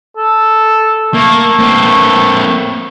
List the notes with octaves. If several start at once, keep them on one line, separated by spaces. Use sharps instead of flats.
A4
A3 A#3
A#3 C4